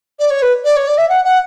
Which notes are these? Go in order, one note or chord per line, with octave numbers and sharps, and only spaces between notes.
D5
C#5
B4
D5
C#5
D5
E5
F#5
F#5